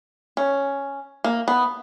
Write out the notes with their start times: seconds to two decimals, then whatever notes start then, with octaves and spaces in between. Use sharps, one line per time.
0.37 C#4
1.24 A#3
1.48 B3